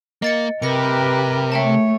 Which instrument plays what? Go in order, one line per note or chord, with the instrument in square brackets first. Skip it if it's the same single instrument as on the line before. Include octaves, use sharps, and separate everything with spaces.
[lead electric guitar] A#3 [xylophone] D#5 A6 C#7
[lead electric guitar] C3 [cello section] G4 A#4 B4 [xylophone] A#6 C#7
[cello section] A3 C#5 [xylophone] E5 G5 A5